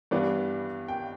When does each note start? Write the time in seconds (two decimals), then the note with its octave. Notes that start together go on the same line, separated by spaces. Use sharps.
0.11 G2 E3 G3 B3 D4 D5
0.88 G5